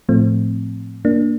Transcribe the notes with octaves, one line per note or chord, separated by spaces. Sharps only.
A2 F3 A3 C4
A#3 D4